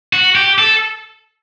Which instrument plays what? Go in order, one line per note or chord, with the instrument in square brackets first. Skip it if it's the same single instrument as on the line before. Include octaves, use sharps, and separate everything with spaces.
[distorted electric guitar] F#4
G4
A4